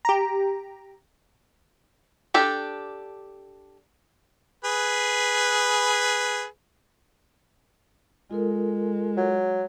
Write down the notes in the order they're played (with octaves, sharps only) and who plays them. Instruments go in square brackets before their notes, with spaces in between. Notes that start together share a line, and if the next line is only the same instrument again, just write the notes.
[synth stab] G4 A#5
[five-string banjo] D4 G4 A4
[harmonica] G#4 B4
[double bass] G#3 [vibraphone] F4 A4 A#4
[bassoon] F#3